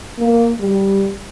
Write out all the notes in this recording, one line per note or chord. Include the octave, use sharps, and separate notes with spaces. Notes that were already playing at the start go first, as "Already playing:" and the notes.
A#3
G3